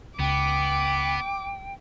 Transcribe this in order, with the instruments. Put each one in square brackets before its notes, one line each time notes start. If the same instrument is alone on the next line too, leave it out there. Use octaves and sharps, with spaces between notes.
[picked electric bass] C#2 [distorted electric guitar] B3 [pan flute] G5 [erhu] D6